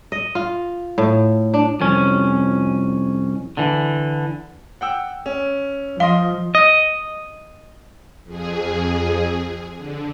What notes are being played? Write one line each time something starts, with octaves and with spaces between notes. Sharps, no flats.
D#5
F4
A2
D4
C2 F2 C#4
D3 E3
F#5 G5 E6
C#4
F3 D#5 F5 C6 G7
D#5
F2 G#4
D3